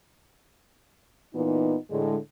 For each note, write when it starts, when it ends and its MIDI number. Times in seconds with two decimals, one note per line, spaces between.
1.35 1.76 46
1.35 1.76 52
1.35 1.76 59
1.35 1.76 63
1.90 2.16 45
1.90 2.16 50
1.90 2.16 56